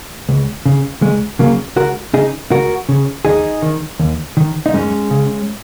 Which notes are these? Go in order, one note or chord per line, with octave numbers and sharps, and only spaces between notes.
C#2
C#3
C#2 G#3
C#3 F#3 A#3
C#2 F#4 A#4
C#3 D#4 G#4
C#2 F#4 A#4
C#3
D#2 D#4 G#4
D#3
D#2
D#3
D#4
F#2 G#3 C#4
C#3